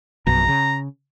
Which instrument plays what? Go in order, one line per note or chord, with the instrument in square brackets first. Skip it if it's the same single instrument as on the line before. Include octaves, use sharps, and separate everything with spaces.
[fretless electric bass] A#1 F#2 B2 [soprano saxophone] A#5
[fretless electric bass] C#3